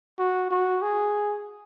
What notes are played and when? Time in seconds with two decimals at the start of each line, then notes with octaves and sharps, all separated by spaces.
0.19 F#4
0.51 F#4
0.82 G#4